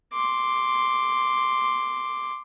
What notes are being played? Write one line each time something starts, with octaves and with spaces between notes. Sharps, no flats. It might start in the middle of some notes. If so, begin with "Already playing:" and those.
C6 D6